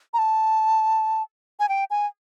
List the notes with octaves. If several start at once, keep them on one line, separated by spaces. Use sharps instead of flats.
A#5
A5
G#5
G5
G#5